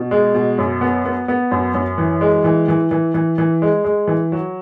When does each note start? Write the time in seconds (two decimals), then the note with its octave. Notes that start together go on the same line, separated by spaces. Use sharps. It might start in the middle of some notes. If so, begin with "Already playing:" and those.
Already playing: B2
0.11 G#3
0.34 B2
0.58 F#2
0.81 B3
1.05 B3
1.28 B3
1.51 F#2
1.74 F#2
1.98 E3
2.21 G#3
2.44 E3
2.68 E3
2.91 E3
3.14 E3
3.38 E3
3.62 G#3
3.84 G#3
4.08 E3
4.32 F#3